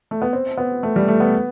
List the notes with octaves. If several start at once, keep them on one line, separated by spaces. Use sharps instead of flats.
A3
B3
C4
B3
A3
G3
A3
B3